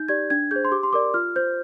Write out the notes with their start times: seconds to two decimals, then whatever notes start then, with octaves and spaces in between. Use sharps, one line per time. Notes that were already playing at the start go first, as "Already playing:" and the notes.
Already playing: D#4 G6
0.08 G4 D5 G#6
0.30 D4 G#6
0.51 G#4 C5 G6
0.65 C6
0.72 G4 D6
0.83 C6
0.93 A#4 D5 D6
1.14 F4 F6
1.36 C5 G6